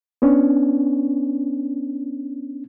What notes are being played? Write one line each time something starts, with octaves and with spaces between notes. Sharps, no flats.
B3 C#4 D4